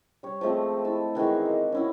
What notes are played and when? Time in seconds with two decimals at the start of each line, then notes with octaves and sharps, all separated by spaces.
0.23 G3 C#5
0.41 F3 G#3 A3 C4
0.85 E4 A5
1.15 D#3 E3 G#3 F#4
1.46 A#3
1.72 C#4 E4 F#4